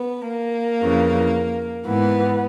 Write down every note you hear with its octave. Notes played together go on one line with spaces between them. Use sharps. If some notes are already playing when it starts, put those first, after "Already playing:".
Already playing: B3
A#3
F2 C#3 E3
G#2 E3 B3